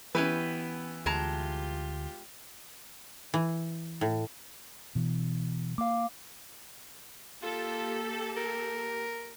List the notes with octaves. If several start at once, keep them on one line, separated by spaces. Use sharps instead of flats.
E3 B3 C#4 G4 B4
D2 G#3 F4 G4 A5 A#5
E3
A2
B2 E3
A#3 F5 D6
A#3 F4 G4 A4
A#4